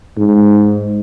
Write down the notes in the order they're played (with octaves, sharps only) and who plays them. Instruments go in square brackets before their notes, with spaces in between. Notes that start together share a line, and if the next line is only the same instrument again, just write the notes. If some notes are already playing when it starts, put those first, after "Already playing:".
[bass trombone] G#2